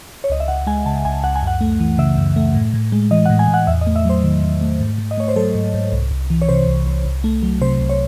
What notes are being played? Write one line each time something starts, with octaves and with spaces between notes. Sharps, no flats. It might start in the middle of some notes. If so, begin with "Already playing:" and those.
C#5
C#2 D#5
E5
C#2 F#5
G#3 G#5
C#3 A5
C#2 G#5
C#2 F#5
G#5
F#2 F#5
A3
E3
C#3 E5
F#2
A3
A2
A2
G#3
E3 D#5
F#5
A2
G#5
A2
F#5
E2 E5
D#5
A3
E5
F#3 C5
D#3
E2
A3
G#2
G#2
D#5
A3 C#5
C5
F#3 A4
G#2
G#2
C2
C2
E3
C#5
C3 C5
C2
C2
C2
A3
F#3
C3 C5
C2
C#5